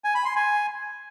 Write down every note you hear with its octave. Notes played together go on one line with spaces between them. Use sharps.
G#5
B5
C6
G#5